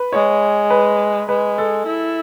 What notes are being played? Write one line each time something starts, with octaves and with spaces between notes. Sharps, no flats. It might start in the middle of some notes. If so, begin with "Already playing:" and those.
Already playing: B4
G#3 C#5
B4
G#3 B4
A4
E4